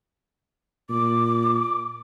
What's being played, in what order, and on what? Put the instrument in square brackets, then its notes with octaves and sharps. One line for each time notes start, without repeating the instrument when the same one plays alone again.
[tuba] A#2 [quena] D6